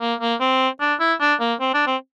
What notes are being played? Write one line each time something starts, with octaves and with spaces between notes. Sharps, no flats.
A#3
A#3
C4
D4
E4
D4
A#3
C4
D4
C4